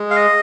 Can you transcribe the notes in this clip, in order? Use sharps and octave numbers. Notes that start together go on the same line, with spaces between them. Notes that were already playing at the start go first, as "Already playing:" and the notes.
Already playing: G#3
F5
D#5